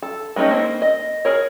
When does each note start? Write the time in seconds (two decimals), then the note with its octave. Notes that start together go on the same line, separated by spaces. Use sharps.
0.02 A4
0.36 G#3 A3 C#4 D#4 G4
0.51 A#3 C4 D#4
0.82 D#5
1.25 G#4 A#4 C#5